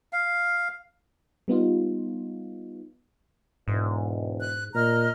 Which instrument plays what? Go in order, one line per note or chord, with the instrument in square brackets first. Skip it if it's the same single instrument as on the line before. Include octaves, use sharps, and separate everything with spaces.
[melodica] F5
[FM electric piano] G3 B3 D#4 F4
[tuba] E1 [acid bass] G#2
[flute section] F#6
[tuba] A#2 [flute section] D#5 A#5 F6